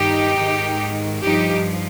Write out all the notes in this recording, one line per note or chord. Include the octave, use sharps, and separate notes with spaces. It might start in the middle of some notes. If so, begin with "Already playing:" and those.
Already playing: G2 D#3 D#4 G4
G#2 D#3
G2 F3 D#4 G4